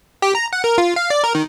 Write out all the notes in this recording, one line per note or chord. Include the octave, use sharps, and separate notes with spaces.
G4
A#5
F#5
A#4
F4
F5
D5
A#4
D#3